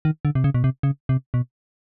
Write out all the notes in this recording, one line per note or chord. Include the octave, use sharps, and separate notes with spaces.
D#3
D3
C3
C#3
B2
C3
C#3
C3
B2